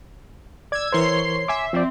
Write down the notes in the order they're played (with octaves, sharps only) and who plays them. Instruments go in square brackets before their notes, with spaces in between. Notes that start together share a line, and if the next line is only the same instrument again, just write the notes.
[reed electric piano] D5 [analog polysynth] E6 G#6
[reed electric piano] E3 A#4 C5 [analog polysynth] C#5 C6 C7
[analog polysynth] E5 [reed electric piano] G#5 D6
[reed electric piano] F3 D5 [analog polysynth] C4